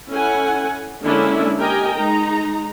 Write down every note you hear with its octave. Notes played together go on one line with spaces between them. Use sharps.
C#4 E4 A4 F#5 G#5
D3 G#3 A#3 C#4 D4 E4
G4 A#4 D#5 G5 G#5
G#3 D#4 A#5